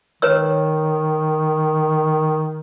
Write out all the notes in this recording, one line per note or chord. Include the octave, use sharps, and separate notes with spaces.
D#3 B4 C#5 E6